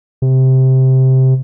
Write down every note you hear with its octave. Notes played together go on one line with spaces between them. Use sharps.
C3